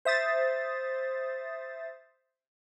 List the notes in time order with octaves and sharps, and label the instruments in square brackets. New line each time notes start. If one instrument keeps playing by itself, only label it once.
[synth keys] C5 E5 D#6 A6